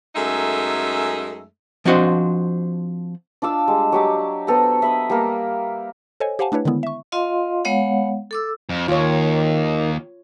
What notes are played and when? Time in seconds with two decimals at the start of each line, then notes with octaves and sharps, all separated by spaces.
0.16 F#2 G#3 A3 D#4 A4 E5
1.85 F3 C4 D4 F#4 C5 D#5
3.42 D4 F4 D6 E6
3.67 G3 G#3
3.92 F#3 G4 D6
4.47 B3 A4 C5 A#5
4.82 E5 B5 D#6
5.10 G3 A#3 A#4
6.20 A4 C5 C#5 D#5 G#5
6.39 G4 C5 F5 F#5 G#5 A5
6.52 A3 D4 E4 B4 C#5
6.65 D3 D#3 G#3 B3 E4
6.83 E5 C#6
7.12 F4 D#5 F5 C6
7.65 G#3 B3 C#5 F5 F#5
8.31 A4 D6 E6
8.69 F2
8.88 D#2 D#3 F4 C#5